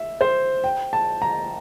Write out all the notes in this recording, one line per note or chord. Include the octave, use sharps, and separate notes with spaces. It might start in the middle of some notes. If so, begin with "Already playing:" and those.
Already playing: E5
C5
G5
A5
A#5